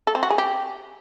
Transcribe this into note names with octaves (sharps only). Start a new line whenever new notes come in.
A4
C4
F#4
G#4
G4